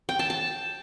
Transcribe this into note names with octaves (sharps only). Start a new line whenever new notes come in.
G5
A5
A5